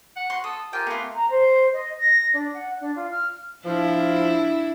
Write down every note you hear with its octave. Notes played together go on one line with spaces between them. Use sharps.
F#5
F#4 C6
A4 D#6
F4 G4 A#4 G5 G#5
A3 B3 F4
A#5
C5
D#5
A#6
D4
F#5
D4
F4
F6
F3 D4 E4